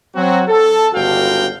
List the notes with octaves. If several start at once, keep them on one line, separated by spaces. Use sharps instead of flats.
F#3 C4 F#4
A4
G1 C#2 D3 F#4 F5 G5